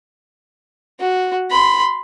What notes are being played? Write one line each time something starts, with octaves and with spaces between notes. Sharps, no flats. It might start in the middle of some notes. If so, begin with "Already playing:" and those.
F#4
B5 C6